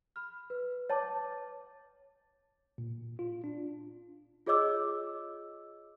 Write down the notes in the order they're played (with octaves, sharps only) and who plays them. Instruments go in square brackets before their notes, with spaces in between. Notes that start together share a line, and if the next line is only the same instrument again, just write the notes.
[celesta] B5 F6
B4
[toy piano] C#5 A5 D6 [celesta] A6
[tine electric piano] A#2
F4
D4
[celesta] F4 G#4 C#5 D#5 D6 E6